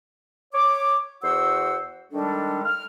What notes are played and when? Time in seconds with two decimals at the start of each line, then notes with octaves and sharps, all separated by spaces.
0.54 C#5 D6
1.23 E2 F#4 C5 F#5 E6
2.12 D#3 G3 G#3 D4 A4
2.65 F6